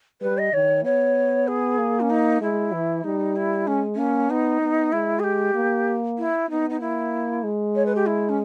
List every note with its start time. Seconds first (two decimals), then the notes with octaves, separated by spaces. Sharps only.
0.21 G3 B4
0.38 D#5
0.53 D#3 C#5
0.84 B3 C#5
1.48 G#4
1.78 A#3
2.01 C#4
2.10 D#4
2.41 G#3 E4
2.73 E3
3.04 G3 D#4
3.36 E4
3.67 G#3 C#4
3.95 A#3 C#4
4.29 B3 D#4
4.61 B3
4.92 G#3 E4
5.20 G#4
5.24 G4
5.55 A#3
6.18 E4
6.49 B3 D#4
6.70 D#4
6.80 A#3 E4
7.44 G#3
7.75 C#5
7.86 B4
7.95 G4
8.06 E4
8.29 C#4